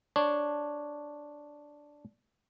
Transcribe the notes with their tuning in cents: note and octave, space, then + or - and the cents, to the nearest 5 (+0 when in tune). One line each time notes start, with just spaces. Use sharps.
D4 +0 C#5 +0